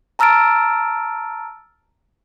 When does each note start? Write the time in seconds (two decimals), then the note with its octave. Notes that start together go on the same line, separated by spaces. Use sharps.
0.19 A5 A#5 E6 F6 A6 D7